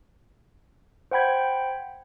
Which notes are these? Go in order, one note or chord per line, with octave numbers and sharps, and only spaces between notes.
C5 F#5 G5 B5 G#6